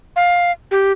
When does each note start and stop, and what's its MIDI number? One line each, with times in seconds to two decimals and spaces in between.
0.16 0.52 77
0.71 0.92 67